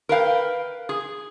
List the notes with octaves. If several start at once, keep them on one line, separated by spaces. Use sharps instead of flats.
A#4 B4 F5 G5
G#4